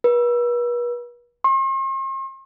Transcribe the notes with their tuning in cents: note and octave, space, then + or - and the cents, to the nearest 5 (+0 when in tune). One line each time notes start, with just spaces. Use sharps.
B4 -40
C6 +45